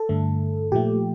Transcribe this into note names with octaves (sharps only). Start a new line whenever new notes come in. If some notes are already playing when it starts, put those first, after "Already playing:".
Already playing: A4
G2 D3 A3
A#2 F3 A3 G4